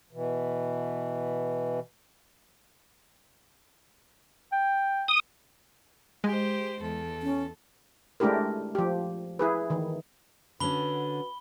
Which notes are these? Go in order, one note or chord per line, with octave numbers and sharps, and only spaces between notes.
B2 E3
G5
D#6
G#3 G4 C5
E2 A4
C#4
G#3 A3 D4 E4 G4 A#4
F3 G4
E4 G#4 B4
D#3 E3
D3 C#4 F#4 B4 B5 G7